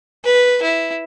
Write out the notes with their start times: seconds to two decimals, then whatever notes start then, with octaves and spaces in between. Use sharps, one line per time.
0.25 B4
0.62 E4